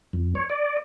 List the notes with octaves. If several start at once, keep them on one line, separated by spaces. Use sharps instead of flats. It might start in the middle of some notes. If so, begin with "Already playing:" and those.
F2
C#5
D5